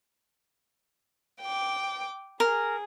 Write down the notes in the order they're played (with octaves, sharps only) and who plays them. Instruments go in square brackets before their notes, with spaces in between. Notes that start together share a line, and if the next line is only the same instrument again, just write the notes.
[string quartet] G5 D6
[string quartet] G#4 [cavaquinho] A#4